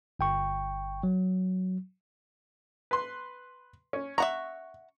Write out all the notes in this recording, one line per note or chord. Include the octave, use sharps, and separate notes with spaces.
G1 G5 C#6
F#3
B4 C6
C#4
E5 F#5 A#5 C#6